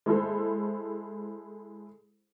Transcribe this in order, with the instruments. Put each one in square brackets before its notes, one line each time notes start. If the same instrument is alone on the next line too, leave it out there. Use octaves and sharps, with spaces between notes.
[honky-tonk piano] G#3 E4 A4 C5